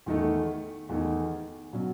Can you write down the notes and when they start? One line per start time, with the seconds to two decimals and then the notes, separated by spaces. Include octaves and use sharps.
0.06 E2 D#3 A3
0.89 E2 D#3 A3
1.73 B2 F#3 C#4